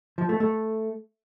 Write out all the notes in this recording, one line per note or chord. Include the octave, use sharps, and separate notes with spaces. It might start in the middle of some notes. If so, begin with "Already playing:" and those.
F3
A3
A3